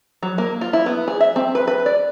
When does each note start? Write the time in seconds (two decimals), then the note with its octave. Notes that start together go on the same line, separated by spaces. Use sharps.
0.23 F#3
0.38 A#3
0.61 F4
0.73 E4
0.86 B3
1.08 G#4
1.21 E5
1.36 C4
1.55 B4
1.67 B4
1.86 D5